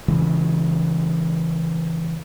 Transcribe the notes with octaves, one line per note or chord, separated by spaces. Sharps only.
C#3 E3 G#3